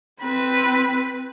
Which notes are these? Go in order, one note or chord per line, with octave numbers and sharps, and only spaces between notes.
C4 B4